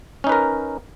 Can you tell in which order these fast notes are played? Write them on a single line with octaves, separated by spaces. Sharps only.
C#4 D#4 B4 A#4